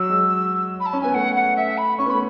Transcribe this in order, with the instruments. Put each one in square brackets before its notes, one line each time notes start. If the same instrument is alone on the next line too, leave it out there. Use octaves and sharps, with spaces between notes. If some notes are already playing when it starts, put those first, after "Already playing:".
Already playing: [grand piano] F#3 [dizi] E6
[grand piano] G#3
[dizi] B5
A5
[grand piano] C#4
[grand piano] B3 [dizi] G#5
[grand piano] A3 [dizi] F#5
[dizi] F#5
E5
B5
[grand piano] C#4 [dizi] C#6
[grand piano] B3
[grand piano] A3 [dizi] B5